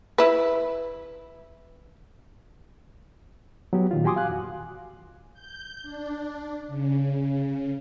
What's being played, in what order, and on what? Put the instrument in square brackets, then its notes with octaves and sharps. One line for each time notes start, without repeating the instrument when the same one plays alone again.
[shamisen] E4 B4
[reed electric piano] F#3 B3 G4
A#2 D#3 F4
F#4 G4 G#5 C6 D6 D#6
F5 G#5 F#6
E2 F#4
[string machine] G6
D4
C#3